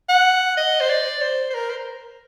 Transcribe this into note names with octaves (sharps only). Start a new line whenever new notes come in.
F#5
D#5
C5
D5
C5
C5
A#4
C5